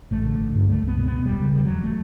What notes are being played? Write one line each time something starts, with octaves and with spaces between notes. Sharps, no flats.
A1 A3
D3
A1
G2
C#2 A3
C#2
B3
B2
B2 B3
E1 G3
C#3
E1 G3
E2 F#3
A3